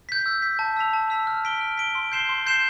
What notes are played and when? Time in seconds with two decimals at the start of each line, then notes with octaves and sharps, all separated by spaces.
0.09 G6 B6
0.26 E6
0.42 G6 B6
0.59 A5
0.77 E6 B6 F7
0.93 A5
1.10 E6 B6 F7
1.27 F6
1.45 B6 D7 G7
1.61 F6
1.77 B6 D7 G7
1.95 C6
2.12 G6 C7 E7 G7
2.29 C6
2.46 G6 C7 E7 G7